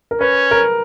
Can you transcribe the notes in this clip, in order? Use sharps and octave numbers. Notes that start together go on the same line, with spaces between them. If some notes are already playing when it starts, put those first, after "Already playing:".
A#4
C#4 B4
A#4